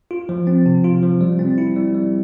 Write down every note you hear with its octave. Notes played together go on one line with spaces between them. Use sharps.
F4
F3
C4
C3
F4
F3
G3
C4
E4
G3
G3